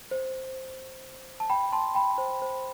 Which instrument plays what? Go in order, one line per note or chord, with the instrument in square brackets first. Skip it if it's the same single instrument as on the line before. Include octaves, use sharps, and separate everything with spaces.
[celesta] C5
A5
G5 B5
A5 C6
G5 B5
C5
C5